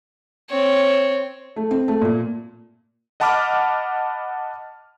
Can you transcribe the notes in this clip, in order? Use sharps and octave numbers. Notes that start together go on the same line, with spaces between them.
C4 C#5
A3
C4
A3
A#2
D#5 F#5 A5 B5 D6 F6